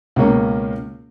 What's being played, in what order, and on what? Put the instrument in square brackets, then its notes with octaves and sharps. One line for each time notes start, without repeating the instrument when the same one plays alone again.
[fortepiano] C#2 B2 A#3 C#4